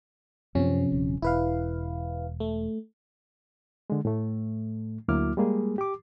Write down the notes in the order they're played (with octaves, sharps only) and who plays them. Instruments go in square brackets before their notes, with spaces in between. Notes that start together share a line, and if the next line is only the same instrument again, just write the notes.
[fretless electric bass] F#2 C4 [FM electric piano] C3 F3 C#4
[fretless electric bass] D#1
[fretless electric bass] E1 [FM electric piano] E4 B4 F5
[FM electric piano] A3
[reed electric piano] D3 G#3
A2 A3
D2 F#3 A#3 E4 D6 F6
G3 G#3 A#3 G#4
G4 D6